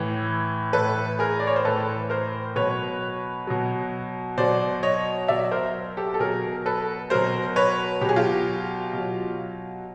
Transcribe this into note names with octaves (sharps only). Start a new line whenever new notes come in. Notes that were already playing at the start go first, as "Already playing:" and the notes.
Already playing: A2 E3
A2 E3 A4 B4
G#4 A#4
D5
C#5
C5
A2 E3 A4 B4
A#4 C5
B2 F#3 B4 C#5
B2 F#3
B2 F#3 C5 D5
C#5 D#5
B2 F#3 D5 E5
A#4 C5
G4 A4
A4
B2 F#3 G#4 A#4
A4 B4
B2 F#3 A#4 C5
B4 C#5
B2 F#3 G4 G#4
F4 G4
B2 F#3